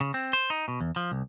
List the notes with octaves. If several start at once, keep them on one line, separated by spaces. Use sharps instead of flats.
C#3
C4
C5
D#4
B2
E2
F3
C2